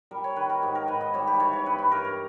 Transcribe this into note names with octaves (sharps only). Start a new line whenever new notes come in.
G3 A#4
C#5
D#3 B4
A#4
G#2 G4
A#4
G#2 B4
D#5
G3 C#5
G4
E3 C#5
C#5
G2 B4
B4
G2 A#4
A#4